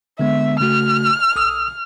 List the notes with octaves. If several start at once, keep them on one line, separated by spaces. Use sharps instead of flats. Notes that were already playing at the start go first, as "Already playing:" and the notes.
D3 G#3 B3 E5
C#3 A3 F#4 F6
B1 D#6 E6